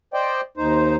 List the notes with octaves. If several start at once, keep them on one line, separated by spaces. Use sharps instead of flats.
C5 D5 D#5 G5
D#2 D#4 C5